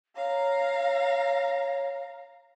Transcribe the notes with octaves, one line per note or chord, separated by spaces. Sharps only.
C#5 F5 A#5